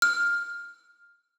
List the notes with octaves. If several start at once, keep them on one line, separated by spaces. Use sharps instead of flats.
F6